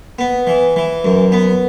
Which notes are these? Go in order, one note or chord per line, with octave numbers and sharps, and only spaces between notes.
B3
E3
E3
F#2
B3